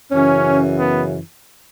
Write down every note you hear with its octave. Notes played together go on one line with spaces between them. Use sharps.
F#2 C#3 E3 C#4
B3